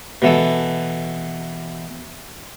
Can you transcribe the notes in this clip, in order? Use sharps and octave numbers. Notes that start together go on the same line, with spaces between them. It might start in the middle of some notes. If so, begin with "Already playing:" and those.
B2 E3 A4